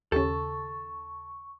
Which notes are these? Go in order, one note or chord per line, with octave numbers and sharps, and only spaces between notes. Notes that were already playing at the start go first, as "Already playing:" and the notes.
D#2 C#3 C#4 G4 A4 C#6